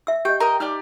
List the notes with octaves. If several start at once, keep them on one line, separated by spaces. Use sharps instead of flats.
E5 E6
G4 D#5 G5
A#4 D#5 G5 A#5
D#4 G4 D5 F6